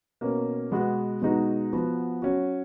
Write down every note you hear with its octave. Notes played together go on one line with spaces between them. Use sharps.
B2 A#3 C#4
B2 G#3 B3 F#4
B2 G#3 D#4 F#4
F3 B3 F#4
F#3 C#4 F#4